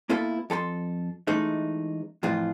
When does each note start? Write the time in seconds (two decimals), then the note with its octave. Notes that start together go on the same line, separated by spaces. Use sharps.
0.09 A#3 B3 E4 F4 A4 B4
0.50 F2 A4 B5 C6
1.27 E3 G#3 A3 C#4 D#4
2.23 F2 A2 E3 F4 G#4